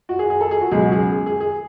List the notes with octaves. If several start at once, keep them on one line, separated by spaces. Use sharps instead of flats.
F#4
G#4
G#4
A4
G#4
F#4
C#2 B2 F#3 G#4
F#4
G#4
G#4
G#4
G#4